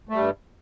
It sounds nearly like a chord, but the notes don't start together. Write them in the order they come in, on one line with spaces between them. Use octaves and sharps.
A3 G3 G2